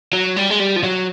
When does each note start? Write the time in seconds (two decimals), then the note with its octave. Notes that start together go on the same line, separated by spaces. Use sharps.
0.13 F#3
0.37 G3
0.50 G#3
0.60 G3
0.76 F3
0.83 F#3